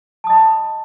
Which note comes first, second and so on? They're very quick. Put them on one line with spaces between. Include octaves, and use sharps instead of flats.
A5 D#6 D#5 B5